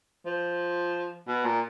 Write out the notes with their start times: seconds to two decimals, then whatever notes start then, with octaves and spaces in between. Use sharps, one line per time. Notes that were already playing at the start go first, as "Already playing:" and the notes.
0.26 F3
1.27 B2
1.45 A#2